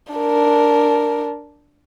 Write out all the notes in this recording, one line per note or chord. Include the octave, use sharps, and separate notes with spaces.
D4 A#4